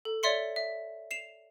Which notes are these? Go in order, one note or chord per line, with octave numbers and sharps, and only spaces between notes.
A4
C#5 D5 E5 C6 C#7
E5
C7 E7 F7